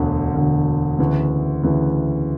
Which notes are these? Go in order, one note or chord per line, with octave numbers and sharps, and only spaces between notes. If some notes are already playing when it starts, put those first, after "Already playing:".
Already playing: E1 D2 D3
E1 D2 D3
D2 C#3 E3
D2 C#3 E3